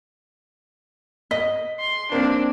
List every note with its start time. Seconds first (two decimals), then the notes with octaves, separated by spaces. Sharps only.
1.31 D#5 B6
1.80 C6
2.12 A#3 C4 D4